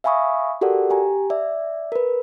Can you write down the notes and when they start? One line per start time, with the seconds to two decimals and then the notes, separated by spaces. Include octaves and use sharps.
0.04 E5 F5 G#5 B5 C#6 D#6
0.61 F#4 G4 A4 A#4 D5 F#5
0.90 G4 G#5 A#5
1.30 D5 E5
1.92 A#4 B4